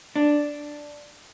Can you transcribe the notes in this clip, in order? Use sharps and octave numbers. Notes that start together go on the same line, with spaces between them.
D4